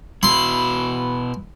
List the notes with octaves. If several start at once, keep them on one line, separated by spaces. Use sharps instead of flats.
B2 E4 C6